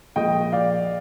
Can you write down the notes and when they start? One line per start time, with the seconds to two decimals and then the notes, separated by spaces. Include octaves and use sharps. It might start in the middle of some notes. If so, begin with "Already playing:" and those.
0.16 A#2 F3 G#3 D#5 G5
0.52 D5 F5